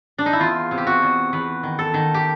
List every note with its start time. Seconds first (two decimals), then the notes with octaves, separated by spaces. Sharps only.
0.18 D4
0.26 D#4
0.33 E4
0.40 E2 F4
0.71 C3
0.78 G4
0.87 F#4
1.02 E2
1.33 E2 B4
1.63 D#3
1.79 A4
1.94 D#3
2.14 G4